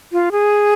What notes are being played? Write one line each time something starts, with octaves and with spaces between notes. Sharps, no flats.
F4
G#4